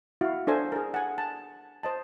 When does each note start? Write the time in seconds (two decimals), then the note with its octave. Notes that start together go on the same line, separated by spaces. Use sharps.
0.21 E4 F#4 F5
0.47 D4 A4 C5 G#5
0.72 G#4 A#4
0.94 F#5 G#5
1.18 A5
1.83 C5 D#5 A5